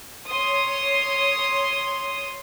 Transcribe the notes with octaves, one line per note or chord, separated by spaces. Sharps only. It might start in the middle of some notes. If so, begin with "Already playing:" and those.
C#5 C6 D#6